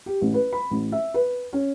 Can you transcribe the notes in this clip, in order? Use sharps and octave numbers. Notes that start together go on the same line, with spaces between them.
G4
A1
B4
B5
A1
E5
B4
C#4